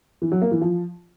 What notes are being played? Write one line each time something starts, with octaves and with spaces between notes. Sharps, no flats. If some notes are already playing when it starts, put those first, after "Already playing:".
E3
F#3
A#3
E3
F3